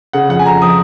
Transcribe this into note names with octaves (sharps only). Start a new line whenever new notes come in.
C#3 F#5
F2 F#5
G#5
F2 A#5
F3 D#6